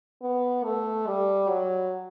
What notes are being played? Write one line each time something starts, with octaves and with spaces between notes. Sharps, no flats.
B3
A3
G3
F#3